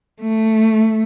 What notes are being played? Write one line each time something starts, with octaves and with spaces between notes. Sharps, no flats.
A3